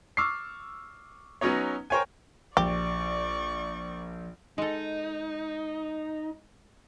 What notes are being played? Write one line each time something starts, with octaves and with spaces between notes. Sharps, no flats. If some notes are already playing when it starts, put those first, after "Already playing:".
C#6 D6 E6 F6 C7
F#3 B3 C#4 D#4 C#5
A#4 C5 C#5 G5 G#5
A#1 G4 D5 C#6
G#3 D#4 A4